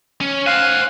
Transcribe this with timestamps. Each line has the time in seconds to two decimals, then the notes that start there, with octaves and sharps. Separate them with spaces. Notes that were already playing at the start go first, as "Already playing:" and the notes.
0.21 C#4
0.46 C5 F5 G#5 F#6